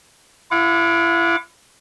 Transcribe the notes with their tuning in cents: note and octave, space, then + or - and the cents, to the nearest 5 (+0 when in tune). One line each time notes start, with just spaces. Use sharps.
E4 +35 F#5 -40 D6 +0